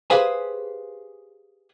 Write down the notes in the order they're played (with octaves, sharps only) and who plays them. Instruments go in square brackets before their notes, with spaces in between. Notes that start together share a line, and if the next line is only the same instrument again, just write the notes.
[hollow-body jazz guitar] G4 G#4 B4 C5 F5 G#5